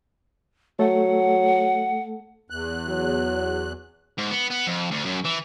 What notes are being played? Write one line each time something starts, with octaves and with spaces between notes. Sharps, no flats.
F#3 A3 A4 F#5
E2 F#6
F#3
G#2
B3
B3
F2
D2
F#2
E3